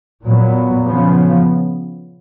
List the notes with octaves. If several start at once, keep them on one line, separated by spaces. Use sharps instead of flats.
A#2 F#3 B3
C#3 F3 B3